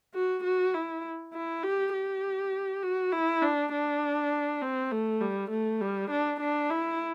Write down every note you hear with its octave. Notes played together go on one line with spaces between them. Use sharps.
F#4
F#4
E4
E4
G4
G4
F#4
E4
D4
D4
C4
A3
G3
A3
G3
D4
D4
E4